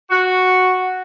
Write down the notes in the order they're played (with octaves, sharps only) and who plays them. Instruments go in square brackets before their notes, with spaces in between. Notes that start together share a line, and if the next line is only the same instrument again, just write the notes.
[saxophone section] F#4